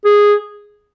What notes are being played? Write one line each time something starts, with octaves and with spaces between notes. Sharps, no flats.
G#4